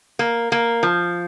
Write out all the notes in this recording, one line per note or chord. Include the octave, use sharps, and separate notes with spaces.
A#3
A#3
F3